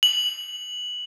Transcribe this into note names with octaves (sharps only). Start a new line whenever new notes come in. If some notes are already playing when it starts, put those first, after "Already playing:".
F#7